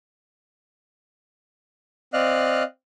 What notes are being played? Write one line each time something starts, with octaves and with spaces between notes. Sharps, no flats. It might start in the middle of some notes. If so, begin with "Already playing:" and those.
C4 D5 D#5 F5 F6 F#6